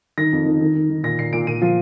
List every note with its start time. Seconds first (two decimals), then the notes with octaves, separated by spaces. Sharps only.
0.17 D#3 A#6
0.32 F2
0.46 D#3
0.61 D#3
0.75 D#3
0.90 D#3
1.03 A#2 A#6
1.19 A#2 C7
1.33 A#2 D7
1.47 A#2 D#7
1.62 F3